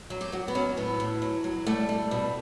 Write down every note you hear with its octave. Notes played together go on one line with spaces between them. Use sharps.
F#3
G4
F#3 F#4
B3
F#3 C#4
A2 B3
A2
F#3
F#3
G3 A3
G3
B2